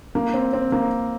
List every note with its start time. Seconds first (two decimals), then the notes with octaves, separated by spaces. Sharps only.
0.15 A#3
0.34 C4
0.53 C4
0.72 A#3